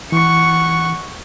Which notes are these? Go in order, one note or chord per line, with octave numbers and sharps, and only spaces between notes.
E3 F#5 C#6